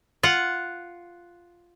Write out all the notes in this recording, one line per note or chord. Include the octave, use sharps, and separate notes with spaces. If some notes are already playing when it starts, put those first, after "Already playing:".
F4 F#5